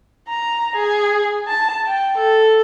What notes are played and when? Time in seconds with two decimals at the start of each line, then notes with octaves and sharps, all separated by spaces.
0.28 A#5
0.76 G#4
1.48 A5
1.87 G5
2.18 A4